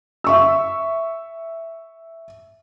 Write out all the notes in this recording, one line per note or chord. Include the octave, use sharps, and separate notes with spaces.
E5 C#6 E6